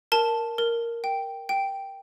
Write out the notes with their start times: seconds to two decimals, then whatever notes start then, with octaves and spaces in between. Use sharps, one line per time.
0.12 A#4 A5
0.58 A#4
1.04 G5
1.49 G5